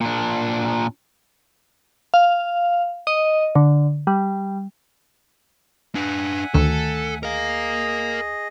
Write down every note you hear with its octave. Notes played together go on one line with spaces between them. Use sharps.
A#2 D4
F5
D#5
D3
G3
D4 B4 E5 F#5 G#5
D2 D#3 A3 A4
G#4 A#4 D#5 F5